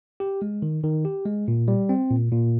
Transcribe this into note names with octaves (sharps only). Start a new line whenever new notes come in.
G4
G#3
D#3
D#3
G4
G#3
A#2
G3
C4
A#2
A#2